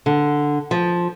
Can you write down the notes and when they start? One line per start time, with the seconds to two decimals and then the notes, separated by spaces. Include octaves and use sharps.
0.06 D3
0.71 F3